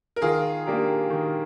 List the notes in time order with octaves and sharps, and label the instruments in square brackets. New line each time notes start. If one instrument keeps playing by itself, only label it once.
[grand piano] A#4
[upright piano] D#3 [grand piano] F4 G#4
[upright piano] A#3 D4 G4 A#4
D#3